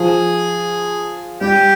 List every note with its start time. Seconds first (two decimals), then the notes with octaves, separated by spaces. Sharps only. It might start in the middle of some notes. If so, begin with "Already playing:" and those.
Already playing: F3 G#4
1.41 G3 G4